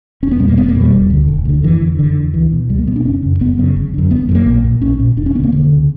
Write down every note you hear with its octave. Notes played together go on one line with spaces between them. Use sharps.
E1 C#4
B3
E2 B2 G3
A#3
E1 B3
A#3
E2 B2
G3
E1
D2 D3
E1
D2 D3
F#1 E3
E2 D3
F#1 D3
E2 D3
C#2 E3
B2
C#2 G3
A#3
B2 B3
D4
F#1 C#4
F#2 C#3
F#1 B3
F#2 C#3
G1
F#2 D3
G1 B3
F#2 D3
A#3
A#1
A#2
A#1 C#4
A#2
E1 D4
C#4
D2 C#3 A#3 B3
E1 D3
D2 C#3